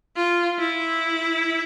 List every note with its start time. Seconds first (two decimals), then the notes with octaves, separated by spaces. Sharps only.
0.16 F4
0.58 E4